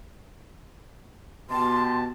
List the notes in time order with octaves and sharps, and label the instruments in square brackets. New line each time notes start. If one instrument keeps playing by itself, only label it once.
[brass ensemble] B2 G4 A5 [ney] C6